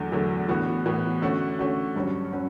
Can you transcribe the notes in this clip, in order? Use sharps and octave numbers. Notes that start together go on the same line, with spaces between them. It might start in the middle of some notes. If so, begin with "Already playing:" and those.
Already playing: E2 D3 F#3 A3
E2 D3 F#3 A3
A2 E3 B3 F#4
A2 E3 B3 F#4
D3 A3 C#4 F#4
D3 A3 C#4 F#4
G2 F#3 C#4 F#4
F#3 C#4 F#4